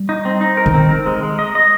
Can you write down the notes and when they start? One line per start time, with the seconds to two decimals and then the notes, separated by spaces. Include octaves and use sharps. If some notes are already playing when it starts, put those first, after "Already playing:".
Already playing: G3
0.09 D#4
0.25 C4
0.41 D#4
0.57 A#4
0.66 D#3
0.74 C4
0.90 A#4
1.06 G#3
1.23 G#3
1.39 D#5
1.55 D#5